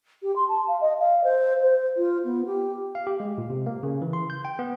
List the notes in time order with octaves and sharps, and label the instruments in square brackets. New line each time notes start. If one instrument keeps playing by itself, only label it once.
[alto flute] G4
C6
A5
F5
D#5
F5
C5
C5
F4
B3
G4
[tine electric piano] F5
G4
G#3
A#2
C3
A#3
C#3
E3
C6
G6
G5
B3